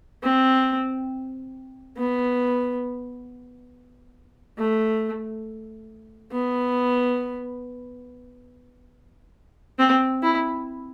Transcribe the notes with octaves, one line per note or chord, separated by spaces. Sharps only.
C4
B3
A3
B3
C4
E4